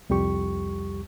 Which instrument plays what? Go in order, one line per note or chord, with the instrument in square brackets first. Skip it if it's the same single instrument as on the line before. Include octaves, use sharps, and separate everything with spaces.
[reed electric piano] C2 F2 G3 G4 C#6